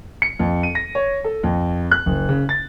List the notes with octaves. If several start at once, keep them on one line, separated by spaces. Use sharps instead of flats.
C#7
F2
D#7
A#6
C#5
A4
F2
F#6
F#1
C#3
A6